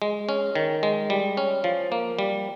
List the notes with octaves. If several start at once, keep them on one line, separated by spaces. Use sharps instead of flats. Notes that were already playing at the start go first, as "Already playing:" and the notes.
G#3
C#4
D#3
G#3
G3
C#4
F3
A#3
G3